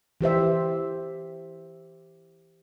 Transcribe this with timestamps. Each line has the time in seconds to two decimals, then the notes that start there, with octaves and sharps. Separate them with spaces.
0.21 E3 G4 C5 E5